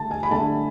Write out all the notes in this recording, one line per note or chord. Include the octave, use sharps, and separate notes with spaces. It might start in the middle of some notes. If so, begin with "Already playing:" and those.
Already playing: D3 A3 A5
G#5
B5
D3 A3 A5